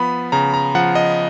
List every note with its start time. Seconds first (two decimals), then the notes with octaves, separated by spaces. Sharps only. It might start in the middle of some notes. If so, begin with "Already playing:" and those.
Already playing: F3 B3 B5
0.32 C#3 A#5
0.54 A#5
0.75 F3 F#5
0.95 D#5